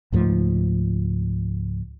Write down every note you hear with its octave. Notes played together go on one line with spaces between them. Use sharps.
C#2 G#2 F3 A3